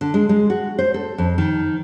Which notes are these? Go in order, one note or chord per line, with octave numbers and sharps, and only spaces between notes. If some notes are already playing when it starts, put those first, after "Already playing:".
D3
G#3
G#3
F#4
C5
A4
F2
D#3